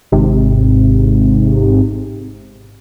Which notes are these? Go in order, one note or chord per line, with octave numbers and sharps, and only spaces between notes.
G#1 G#2 C3